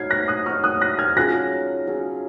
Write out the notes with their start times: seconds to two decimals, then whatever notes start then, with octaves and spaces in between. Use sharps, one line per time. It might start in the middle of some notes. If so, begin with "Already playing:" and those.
Already playing: D#4 F#4 C#5 F6 G#6 C7
0.10 F#6 A#6
0.28 D#6 F#6
0.46 D#4 F#4 C#5 F5 C#6 F6
0.64 D#6 F#6
0.81 F#6 A#6
0.99 F6 G#6
1.17 F#3 C#4 F4 G#4 F#6 A#6
1.87 F#3 C#4 F4 G#4